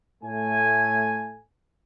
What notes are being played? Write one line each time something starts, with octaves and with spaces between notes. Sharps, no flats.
A2 A3 G#5